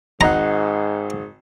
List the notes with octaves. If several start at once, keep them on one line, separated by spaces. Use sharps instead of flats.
G#1 G#2 D#4 F#5 A#5